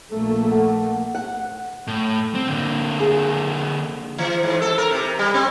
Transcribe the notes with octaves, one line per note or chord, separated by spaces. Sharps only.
A#1 A3 A#3 A4
F#5
F#5
A2
C4
D3 A#3
G#4
E3
G#2
A4
A#4
C3
G3
C4